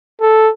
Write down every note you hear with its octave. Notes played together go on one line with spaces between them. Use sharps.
A4